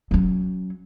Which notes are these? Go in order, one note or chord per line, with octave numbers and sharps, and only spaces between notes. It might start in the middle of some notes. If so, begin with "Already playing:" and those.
F#3 C#4